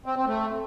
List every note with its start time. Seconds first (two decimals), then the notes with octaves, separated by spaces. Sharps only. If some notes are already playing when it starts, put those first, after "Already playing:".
0.06 C4
0.16 C4
0.27 A3